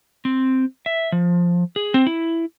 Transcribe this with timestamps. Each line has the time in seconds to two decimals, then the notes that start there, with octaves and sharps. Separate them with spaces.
0.25 C4
0.86 E5
1.12 F3
1.76 G#4
1.94 C4
2.07 E4